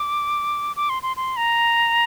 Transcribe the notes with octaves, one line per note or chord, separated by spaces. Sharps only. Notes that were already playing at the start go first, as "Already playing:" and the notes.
Already playing: D6
D6
C6
C6
C6
A#5